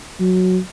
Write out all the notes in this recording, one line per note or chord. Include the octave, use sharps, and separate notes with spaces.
F#3